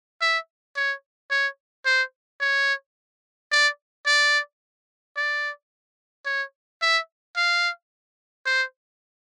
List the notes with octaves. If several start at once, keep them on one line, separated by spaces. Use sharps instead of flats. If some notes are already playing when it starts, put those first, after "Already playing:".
E5
C#5
C#5
C5
C#5
D5
D5
D5
C#5
E5
F5
C5